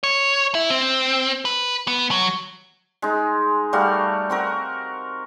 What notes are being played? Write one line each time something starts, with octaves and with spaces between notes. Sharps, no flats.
C#5
E4
C4
B4
B3
F#3
G#3 D#4
G3 A3 F#4 F5
C4 F#4 A#4